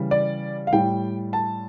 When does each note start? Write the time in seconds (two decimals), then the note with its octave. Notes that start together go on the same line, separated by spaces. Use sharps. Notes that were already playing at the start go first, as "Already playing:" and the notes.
Already playing: C#3 E3 G3
0.11 D5
0.67 F5
0.73 A2 G3 G5
1.33 A5